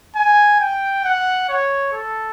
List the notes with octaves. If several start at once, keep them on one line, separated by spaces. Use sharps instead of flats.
G#5
G5
F#5
C#5
A4